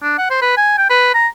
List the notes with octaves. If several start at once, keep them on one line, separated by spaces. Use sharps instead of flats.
D4
F#5
C5
B4
G#5
G5
B4
A#5